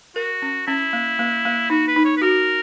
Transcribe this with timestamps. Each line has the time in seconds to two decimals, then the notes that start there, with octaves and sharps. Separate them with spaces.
0.16 F#4 A#4
0.42 C#4
0.67 C#4 E4
0.93 A#3
1.19 A#3
1.45 A#3
1.70 D#4 F#4
1.88 B4
1.96 D#4
2.05 C#5
2.17 B4
2.22 F#4 A#4